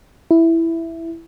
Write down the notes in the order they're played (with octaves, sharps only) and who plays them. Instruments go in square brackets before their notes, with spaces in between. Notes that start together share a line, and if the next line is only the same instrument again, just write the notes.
[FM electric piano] E4